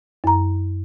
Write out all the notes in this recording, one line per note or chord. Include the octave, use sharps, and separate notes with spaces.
F#2 A#5